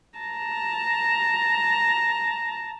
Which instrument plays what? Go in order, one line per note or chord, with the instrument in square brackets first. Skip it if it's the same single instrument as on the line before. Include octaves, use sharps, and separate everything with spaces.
[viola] A5 A#5